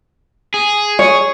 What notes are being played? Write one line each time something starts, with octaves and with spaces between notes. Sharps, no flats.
G#4
C#5